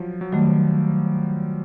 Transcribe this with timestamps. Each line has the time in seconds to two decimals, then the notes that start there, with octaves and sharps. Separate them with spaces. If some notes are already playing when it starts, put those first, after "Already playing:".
Already playing: F3 F#3
0.21 F#3
0.32 D#3 F#3 G3 A3